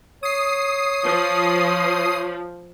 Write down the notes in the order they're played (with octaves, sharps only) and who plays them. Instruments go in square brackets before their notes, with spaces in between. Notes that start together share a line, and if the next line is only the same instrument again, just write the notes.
[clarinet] C#5 [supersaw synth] D#6 C7
[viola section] F3